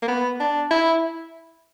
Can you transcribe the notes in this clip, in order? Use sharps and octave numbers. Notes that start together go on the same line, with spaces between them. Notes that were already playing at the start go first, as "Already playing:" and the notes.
A#3
B3
D4
E4